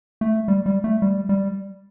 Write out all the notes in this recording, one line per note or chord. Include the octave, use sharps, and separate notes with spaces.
A3
G3
G3
A3
G3
G3